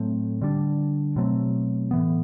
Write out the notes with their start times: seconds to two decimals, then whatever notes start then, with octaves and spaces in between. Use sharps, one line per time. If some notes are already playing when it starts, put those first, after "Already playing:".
Already playing: A2 F#3 A3 C4
0.42 D3 G3 D4
1.16 B2 F#3 A3 C4
1.91 A2 E3 B3